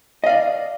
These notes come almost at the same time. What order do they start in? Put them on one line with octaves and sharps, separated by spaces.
D#5 F5 D5